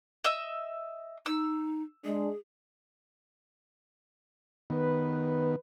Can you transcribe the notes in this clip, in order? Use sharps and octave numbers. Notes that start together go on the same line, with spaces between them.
D#5 E5 E6
D#4 E6
G#3 D4 G#4
D#3 B3 B4